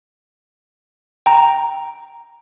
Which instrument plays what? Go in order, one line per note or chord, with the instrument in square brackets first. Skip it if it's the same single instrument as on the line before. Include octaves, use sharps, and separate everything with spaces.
[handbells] G5 A#5